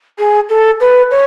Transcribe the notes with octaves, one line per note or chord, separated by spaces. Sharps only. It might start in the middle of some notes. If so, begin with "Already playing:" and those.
G#4
A4
B4
C#5